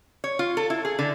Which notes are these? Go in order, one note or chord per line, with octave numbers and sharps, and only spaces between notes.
C#5
F4
A4
E4
G#4
D3